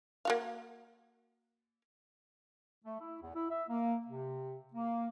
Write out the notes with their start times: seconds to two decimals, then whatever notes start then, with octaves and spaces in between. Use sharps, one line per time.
0.25 A#3 F#4 F5
2.85 A3
3.00 E4
3.22 E2
3.34 E4
3.50 E5
3.68 A#3
4.07 C3
4.74 A#3